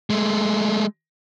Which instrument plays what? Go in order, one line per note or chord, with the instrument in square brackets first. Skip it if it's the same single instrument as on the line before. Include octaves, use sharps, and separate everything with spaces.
[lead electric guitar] G#3 A3